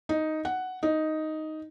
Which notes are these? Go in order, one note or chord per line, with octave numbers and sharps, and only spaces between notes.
D#4
F#5
D#4